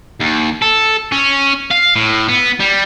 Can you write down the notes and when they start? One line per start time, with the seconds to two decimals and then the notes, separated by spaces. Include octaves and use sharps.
0.21 D#2
0.62 A4
1.12 C#4
1.71 F5
1.95 A2
2.29 B3
2.60 G3